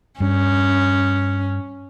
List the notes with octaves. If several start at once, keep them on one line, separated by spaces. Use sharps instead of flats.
G2 C#4